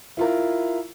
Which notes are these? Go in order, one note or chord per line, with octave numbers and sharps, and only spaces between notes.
E4 F4 A#4